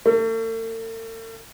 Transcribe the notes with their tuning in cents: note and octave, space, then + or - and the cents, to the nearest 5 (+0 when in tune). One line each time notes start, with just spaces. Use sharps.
A3 +45